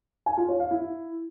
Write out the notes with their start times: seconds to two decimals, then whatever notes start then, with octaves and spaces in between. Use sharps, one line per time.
0.26 G#5
0.37 F4
0.49 C#5
0.60 F5
0.71 E4